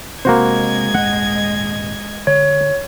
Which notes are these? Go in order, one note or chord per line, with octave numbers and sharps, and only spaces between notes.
C3 G#3 A#3 C4 F#4 C5 D#5 G#6
D#1 G#1 F#5
D3 C#5